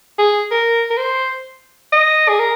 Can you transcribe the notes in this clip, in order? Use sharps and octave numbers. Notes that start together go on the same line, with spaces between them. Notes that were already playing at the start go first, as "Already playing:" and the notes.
G#4
A#4
A#4
C5
D#5
G#4
A#4